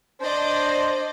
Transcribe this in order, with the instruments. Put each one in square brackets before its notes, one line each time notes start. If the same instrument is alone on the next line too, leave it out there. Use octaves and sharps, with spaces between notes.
[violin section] D4 D5 D#5 [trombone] C5